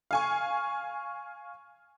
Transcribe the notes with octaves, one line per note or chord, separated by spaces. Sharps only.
F5 G#5 C#6